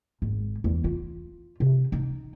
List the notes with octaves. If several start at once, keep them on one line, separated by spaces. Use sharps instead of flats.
G#1
E2
F4
C3
D#4